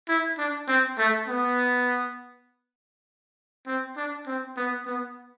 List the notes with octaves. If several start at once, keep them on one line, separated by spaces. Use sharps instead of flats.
E4
D4
C4
A3
B3
C4
D4
C4
B3
B3